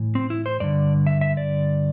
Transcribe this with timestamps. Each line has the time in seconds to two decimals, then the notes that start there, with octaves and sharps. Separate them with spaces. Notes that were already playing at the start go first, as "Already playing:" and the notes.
Already playing: A2 E3
0.15 C4
0.30 E4
0.46 C5
0.60 G2 D3 D5
1.07 E5
1.21 E5
1.37 D5